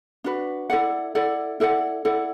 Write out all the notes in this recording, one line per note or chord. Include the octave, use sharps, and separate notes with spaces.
D4 F#4 B4
E4 A4 D5 F#5
E4 A4 D5 F#5
E4 A4 D5 F#5
E4 A4 D5 F#5